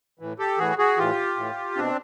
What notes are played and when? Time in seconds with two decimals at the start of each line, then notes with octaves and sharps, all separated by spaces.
0.19 A2 E3
0.39 G4 A4
0.58 A2 E3 F#4 G#4
0.78 F#4 G#4
0.97 A2 E3 F4 G4
1.36 A2 E3
1.76 B2 C4 D4